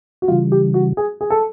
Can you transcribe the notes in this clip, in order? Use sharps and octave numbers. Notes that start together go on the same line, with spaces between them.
F#4
C#3 E3 G3 F4
G4
F#4
G#4
G#4
A4